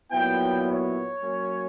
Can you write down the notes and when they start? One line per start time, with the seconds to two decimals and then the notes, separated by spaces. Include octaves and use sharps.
0.11 A#2 F#3 B3 E4 G5
0.67 C#5
1.23 F#3 A#3 C#4